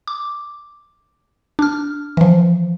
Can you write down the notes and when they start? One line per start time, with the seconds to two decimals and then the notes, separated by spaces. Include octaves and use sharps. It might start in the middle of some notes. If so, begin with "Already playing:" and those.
0.07 D6
1.59 D4 F6
2.17 E3 F3